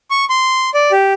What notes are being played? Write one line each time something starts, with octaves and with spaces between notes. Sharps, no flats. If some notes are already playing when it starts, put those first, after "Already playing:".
C#6
C6
D5
G4